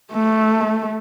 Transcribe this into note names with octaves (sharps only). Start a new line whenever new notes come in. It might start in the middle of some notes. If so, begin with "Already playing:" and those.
A3